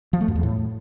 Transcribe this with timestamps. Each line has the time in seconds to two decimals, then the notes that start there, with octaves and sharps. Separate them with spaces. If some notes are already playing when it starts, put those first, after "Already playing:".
0.13 F3
0.21 A3
0.28 F#2
0.36 E2
0.43 A2